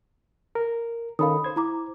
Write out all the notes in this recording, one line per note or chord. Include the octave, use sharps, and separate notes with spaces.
A#4
D#3 C#4 A4 F5 B5 D#6
C5 G#6
E4 A#5 D6